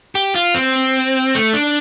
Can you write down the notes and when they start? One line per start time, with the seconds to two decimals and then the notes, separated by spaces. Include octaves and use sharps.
0.15 G4
0.35 F4
0.55 C4
1.35 A3
1.54 D4